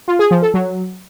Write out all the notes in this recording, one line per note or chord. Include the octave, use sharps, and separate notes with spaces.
F4
G#4
F3
A4
F#3